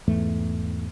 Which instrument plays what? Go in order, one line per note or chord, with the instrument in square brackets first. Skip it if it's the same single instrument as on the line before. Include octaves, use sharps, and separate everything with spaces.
[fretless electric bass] E2 G#2 E3 A3